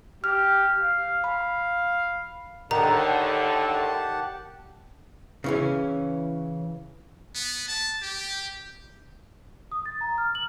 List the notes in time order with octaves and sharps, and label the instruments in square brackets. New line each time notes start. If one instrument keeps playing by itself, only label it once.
[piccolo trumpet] G4 [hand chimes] F6
[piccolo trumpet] F5
[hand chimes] B5
[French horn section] A2 D3 [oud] D#3 [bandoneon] G4 F#5 A5 [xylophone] A#5
[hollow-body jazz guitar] C#3 E3 C#4
[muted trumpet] B3
A5
G4
[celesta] D#6
A6
A#5
F6
F#7